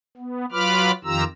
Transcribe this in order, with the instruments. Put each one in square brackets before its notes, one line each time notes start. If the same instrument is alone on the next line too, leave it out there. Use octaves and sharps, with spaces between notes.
[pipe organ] B3
F#3 F4 B4 B5 D6 F6
F2 D#3 F4 G4 A#5 E6